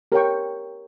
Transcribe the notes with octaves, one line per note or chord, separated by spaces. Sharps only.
G4 A#4 C#5 G5 C#6